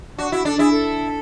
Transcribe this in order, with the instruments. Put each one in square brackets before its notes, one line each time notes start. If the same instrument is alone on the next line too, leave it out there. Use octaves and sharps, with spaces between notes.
[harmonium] D4 [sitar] F#4
[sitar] E4 [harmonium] F#4
[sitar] D4 [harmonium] A4
[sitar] E4 [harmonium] G#4
[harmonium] A4